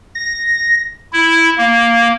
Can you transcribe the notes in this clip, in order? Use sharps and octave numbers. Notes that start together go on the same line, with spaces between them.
A#6
E4
A#3